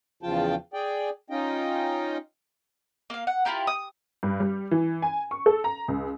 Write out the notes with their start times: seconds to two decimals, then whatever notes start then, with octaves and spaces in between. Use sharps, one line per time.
0.23 E2 C#3 F3 F4 G5 A5
0.74 G#4 D5 G5
1.30 C#4 D#4 F4 D#5 G5
3.10 A#3 F5
3.27 F#5
3.45 E4 F4 G4 A#4
3.67 D#6
4.23 G2
4.40 G3
4.71 E3
5.02 G#5
5.31 C#6
5.46 A4
5.64 A#5
5.88 C#2